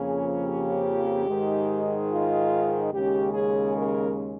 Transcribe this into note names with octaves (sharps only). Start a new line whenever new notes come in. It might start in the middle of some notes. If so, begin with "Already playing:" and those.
Already playing: F2 C#3 F3 A#3 C#4 G#4
G4
G#2 D#3 G#3
F4
D#2 C#3 G#3 C#4 G4
G#4
A#4